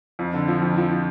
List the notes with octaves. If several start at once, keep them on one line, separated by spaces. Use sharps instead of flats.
F2
D3
F3
F2
F3
F3